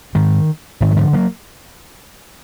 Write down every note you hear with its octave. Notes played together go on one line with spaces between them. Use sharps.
G#2 D#3
G#2 D#3
F#3
D3 F3
F#3 A#3